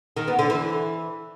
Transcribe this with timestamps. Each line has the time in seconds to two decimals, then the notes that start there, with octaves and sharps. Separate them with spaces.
0.17 D#3
0.28 B3
0.39 D3
0.50 E3